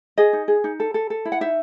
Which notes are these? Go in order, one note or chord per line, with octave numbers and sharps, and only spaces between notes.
G#4 D#5
D#4
G#4
D#4
A4
A4
A4
E4
F#5
D#4 E5